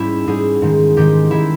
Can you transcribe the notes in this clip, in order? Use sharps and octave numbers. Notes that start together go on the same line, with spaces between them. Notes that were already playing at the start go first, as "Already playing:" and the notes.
Already playing: G#2 G3 C#4 E4
G#2 G3 G#4
G#2 D#3 G#3
G#2 D#3 G#3 G4
D#3 G#3 E4